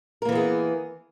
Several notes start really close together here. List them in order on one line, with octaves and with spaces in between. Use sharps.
A#4 A#3 E3 B3 G#4